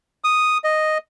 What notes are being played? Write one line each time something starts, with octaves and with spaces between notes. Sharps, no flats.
D#6
D#5